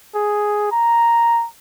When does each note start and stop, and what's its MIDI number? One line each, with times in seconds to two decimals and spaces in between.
0.15 0.71 68
0.71 1.46 82